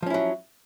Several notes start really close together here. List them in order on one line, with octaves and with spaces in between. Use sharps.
F3 C#4 E4 F#3